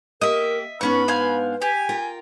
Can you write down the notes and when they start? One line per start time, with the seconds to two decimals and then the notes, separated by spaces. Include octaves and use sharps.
0.22 A#3 G4 A#4 D#5 E5
0.81 G#2 B3 C#4 D4 B4 B5 C#6
1.08 C5 F5 G#5
1.62 G4 G#5
1.89 F4 A#4 G5